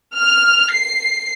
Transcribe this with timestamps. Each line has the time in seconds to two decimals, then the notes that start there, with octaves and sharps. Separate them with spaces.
0.16 F6
0.73 C7